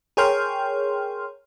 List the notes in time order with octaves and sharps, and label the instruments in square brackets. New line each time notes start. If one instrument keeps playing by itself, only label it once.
[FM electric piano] G#4 A#4 C#5 G5 C6 F6